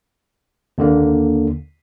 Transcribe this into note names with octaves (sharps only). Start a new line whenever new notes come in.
D#2 D3 A#3